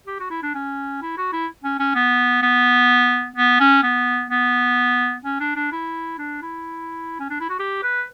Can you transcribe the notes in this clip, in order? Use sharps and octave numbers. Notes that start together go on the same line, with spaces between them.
G4
F#4
E4
D4
C#4
E4
F#4
E4
C#4
C#4
B3
B3
B3
C#4
B3
B3
C#4
D4
D4
E4
D4
E4
C#4
D4
E4
F#4
G4
B4